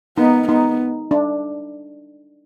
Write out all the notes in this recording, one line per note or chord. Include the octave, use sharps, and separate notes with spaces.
B3 D#4
B3 D#4
D4